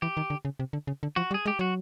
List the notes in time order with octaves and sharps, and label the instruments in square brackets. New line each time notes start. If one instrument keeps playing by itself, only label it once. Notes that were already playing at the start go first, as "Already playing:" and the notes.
[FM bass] E3 [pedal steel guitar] G4
[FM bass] D#3
D3
C#3
C3
D3
C#3
D3
[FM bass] F3 [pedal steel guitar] F#4
[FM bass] G3
[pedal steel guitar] G#4
[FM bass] G#3 [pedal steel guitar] G4
[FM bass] F#3 [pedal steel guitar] F#4